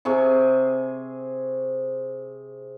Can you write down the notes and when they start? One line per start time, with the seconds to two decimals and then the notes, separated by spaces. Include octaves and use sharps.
0.05 C3 G#4 C#6